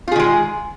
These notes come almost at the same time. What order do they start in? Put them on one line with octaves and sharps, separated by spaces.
F4 G#4 D#3 G#3